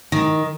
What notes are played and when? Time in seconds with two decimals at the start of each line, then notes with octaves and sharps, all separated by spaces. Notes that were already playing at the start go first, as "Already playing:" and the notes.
0.12 D#3